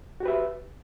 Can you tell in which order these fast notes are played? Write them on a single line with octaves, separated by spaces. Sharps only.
F#4 G4 B4 E5